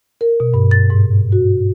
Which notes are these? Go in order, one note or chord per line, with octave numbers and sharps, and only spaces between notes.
A#4
B2
G2
A6
G#2
F#4